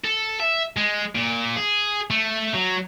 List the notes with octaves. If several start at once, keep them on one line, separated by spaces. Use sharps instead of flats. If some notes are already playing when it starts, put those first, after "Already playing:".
A4
E5
G#3
A#2
G#4
A3
F#3